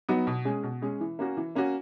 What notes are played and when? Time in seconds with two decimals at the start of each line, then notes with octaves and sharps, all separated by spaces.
0.09 F#3 B3 D#4 F#4
0.27 B2
0.45 G#3 C#4 G#4
0.63 B2
0.82 G#3 C#4 G#4
1.01 E3
1.19 A#3 C#4 F#4
1.37 E3
1.55 A#3 C#4 F#4